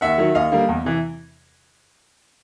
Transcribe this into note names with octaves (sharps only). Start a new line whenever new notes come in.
D#2 E5 F#5
D#3 F#3
D#2 D#5 F5
D3 G3 A#3
E2
C3 E3